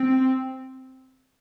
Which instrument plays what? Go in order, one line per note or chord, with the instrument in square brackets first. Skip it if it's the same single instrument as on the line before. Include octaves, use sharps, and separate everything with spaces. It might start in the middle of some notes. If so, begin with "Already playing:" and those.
Already playing: [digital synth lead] C4